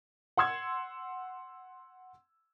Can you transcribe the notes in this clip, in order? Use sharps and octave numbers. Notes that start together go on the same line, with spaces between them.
F#5 C6 E6 G#6